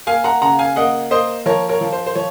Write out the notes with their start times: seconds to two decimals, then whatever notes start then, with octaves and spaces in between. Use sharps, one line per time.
0.07 A#3 F5 G#5
0.24 F#5 A#5
0.41 C#3 F#5 A#5
0.59 F5 G#5
0.76 A#3 D#5 F#5
1.11 A#3 C5 D#5
1.46 F3 A#4 C#5
1.69 A#4 C#5
1.81 F3
1.92 C5
2.06 C5
2.15 F3 C#5